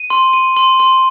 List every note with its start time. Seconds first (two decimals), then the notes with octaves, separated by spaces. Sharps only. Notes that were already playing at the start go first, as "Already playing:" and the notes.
Already playing: D#7
0.10 C6
0.33 D#7
0.57 C6
0.80 C6